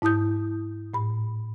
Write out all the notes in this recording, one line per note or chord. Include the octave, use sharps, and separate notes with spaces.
G#2 E4 A5 D#6 G6
A2 B5